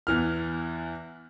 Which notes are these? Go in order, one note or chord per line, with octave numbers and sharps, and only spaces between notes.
E2 E3 F6